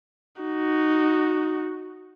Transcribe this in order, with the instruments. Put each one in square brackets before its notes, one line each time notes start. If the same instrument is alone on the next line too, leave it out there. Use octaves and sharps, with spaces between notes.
[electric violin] D#4 F#4